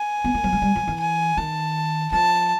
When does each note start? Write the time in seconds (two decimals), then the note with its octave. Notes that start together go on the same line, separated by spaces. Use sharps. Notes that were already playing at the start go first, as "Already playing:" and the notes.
Already playing: G#5
0.24 B3
0.34 A#3
0.44 F#3
0.53 G#3
0.62 G3
0.75 F#3
0.88 E3
1.00 G#5
1.37 D#3 A5
2.12 F3 A5